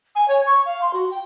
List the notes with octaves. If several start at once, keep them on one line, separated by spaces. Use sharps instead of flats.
G#5
C#5
C#6
F5
C6
F#4
G5